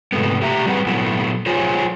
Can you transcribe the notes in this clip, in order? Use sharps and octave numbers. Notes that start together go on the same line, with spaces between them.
G#2 C3 A3 B3
A2 G4 E5 A#5
G3 C4 G#4 B4 F5 F#5
A#2 F#3 A3 B3 E4
F#3 F4 G#4 C5 C#5